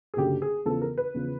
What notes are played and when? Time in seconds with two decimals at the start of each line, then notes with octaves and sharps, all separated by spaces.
0.14 G#4
0.17 F#1 F#2 D3 G4
0.42 G#4
0.65 E2 C#3 F3 A4
0.82 A#4
0.98 B4
1.14 E2 C#3 F3